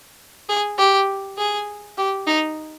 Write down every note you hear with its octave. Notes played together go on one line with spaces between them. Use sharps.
G#4
G4
G#4
G4
D#4